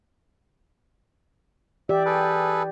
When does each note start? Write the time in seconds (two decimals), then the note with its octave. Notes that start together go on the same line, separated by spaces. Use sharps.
1.89 E3 G4 D5 E5
2.06 G#4 A4 B4